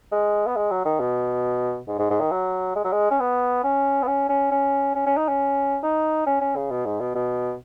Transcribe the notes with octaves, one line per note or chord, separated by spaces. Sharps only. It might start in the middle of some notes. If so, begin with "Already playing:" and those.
G#3
B3
G#3
F#3
D#3
B2
G#2
G#2
G#2
D#3
F#3
G#3
F#3
G#3
C#4
B3
C#4
B3
C#4
C#4
C#4
C#4
C#4
D#4
C#4
D#4
C#4
C#4
C#3
B2
G#2
B2
B2